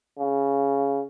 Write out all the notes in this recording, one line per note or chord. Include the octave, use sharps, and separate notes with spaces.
C#3